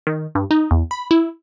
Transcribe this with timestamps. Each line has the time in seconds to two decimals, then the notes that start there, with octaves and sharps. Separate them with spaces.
0.07 D#3
0.35 G2
0.51 D#4
0.71 E2
0.91 B5
1.11 E4